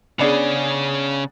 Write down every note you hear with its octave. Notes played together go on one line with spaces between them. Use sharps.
C#3 B3 C#4 D4 G#4